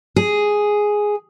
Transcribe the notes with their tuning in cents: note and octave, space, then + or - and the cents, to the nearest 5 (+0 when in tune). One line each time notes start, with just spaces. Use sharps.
G#4 +0